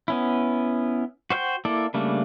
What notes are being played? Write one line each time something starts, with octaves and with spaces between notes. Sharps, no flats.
B3 C#4 E4
F#4 C5 F5 G5
A#3 E4 A4 D5
C#3 G3 A3 A#3 D4